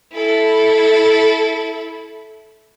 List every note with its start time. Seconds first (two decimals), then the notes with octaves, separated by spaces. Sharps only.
0.14 E4 A4